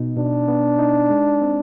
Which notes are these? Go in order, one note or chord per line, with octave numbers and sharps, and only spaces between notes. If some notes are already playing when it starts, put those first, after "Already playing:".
Already playing: B2 B3 D#4
B2 D4
B3
D#4
G#3
C4